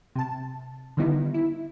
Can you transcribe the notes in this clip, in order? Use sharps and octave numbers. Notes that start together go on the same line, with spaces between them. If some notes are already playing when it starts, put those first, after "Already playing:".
C3 A5
D3 D#3 G3 B3 D#4 E4
E4